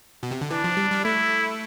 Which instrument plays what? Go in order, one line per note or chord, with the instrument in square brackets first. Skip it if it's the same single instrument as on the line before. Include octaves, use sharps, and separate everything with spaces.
[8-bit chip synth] B2
C3
D3
[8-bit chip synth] E3 [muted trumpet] D4
[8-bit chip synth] F3
G3
G3
[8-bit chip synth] A3 [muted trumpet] E4